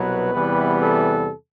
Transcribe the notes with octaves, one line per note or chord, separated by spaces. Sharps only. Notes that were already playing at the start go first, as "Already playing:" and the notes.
Already playing: C2 B2 F#3 B4
E2 C3 E3 G3 B3
A4